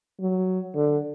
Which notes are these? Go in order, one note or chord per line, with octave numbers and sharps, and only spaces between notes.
F#3
D3